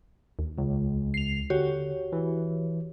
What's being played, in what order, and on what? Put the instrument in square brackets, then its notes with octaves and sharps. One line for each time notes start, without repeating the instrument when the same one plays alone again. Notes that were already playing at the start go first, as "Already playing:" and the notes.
[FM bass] D#2
[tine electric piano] C#2
[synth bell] C7 F7
[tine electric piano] D3 [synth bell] F#4 G4 C#5
[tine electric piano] E3